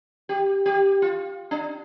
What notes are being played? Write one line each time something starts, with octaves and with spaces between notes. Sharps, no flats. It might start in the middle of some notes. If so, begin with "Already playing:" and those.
G4
G4
F4
D4